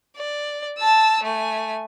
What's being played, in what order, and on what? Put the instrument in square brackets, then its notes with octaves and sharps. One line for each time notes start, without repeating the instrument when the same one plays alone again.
[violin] D5
A5 E6
A3 G#5